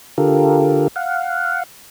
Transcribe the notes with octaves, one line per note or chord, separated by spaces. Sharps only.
D3 F4 G4 A4 A#4
F5 F#5